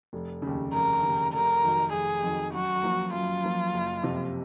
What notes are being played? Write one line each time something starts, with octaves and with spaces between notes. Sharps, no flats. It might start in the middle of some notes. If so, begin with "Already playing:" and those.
F1
D#2 C#3
F1 A#4
D#2 C#3
F1 A#4
F2 D#3 F#3
F1 G#4
F2 D#3 F#3
F#2 F#4
F3 A#3
F#2 F4
F3 A#3
F#1
F2 C3 F3